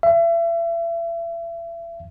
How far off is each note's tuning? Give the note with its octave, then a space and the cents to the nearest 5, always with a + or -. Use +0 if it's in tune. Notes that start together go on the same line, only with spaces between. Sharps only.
E5 +35